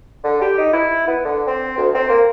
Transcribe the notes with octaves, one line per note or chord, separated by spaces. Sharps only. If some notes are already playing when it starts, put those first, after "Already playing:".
D3
G4
D#4
E4
B3
D3
C4
D2
C4
A#3